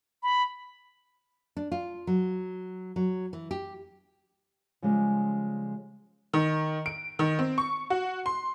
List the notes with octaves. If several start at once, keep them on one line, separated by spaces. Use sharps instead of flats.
B5
D4
F4
F#3
F#3
E3
G4
C#3 F3 G3 G#3
D#3
D7
D#3
C4
C#6
F#4
C6